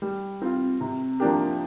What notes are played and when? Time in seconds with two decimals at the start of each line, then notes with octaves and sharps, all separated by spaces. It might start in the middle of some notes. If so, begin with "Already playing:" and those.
0.02 G3
0.42 C4 F4
0.81 C3
1.20 F3 A#3 D4 G4